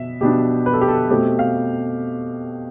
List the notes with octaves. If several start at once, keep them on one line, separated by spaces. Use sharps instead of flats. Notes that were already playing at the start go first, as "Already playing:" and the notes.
Already playing: B2 B3 E5
B2 B3 D4 G4
B4
A4
G4
A4
B2 A3 C4 G4
F5